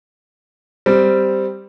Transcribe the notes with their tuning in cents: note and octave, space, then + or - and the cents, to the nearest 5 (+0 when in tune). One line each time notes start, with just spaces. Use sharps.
G3 +0 C4 -10